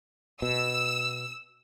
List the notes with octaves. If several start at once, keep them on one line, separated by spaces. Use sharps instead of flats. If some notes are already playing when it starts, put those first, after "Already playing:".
B2 E6